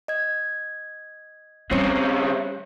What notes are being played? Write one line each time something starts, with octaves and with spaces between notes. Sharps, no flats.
D#5 G#6
C#3 G3 C4 C#5 C#7